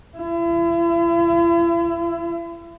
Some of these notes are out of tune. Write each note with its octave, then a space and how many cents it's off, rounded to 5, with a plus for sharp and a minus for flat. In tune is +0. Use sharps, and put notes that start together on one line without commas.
E4 +40